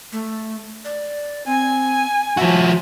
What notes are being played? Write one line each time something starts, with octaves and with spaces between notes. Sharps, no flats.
A3
D5
C4 G#5
F3 F#4 E5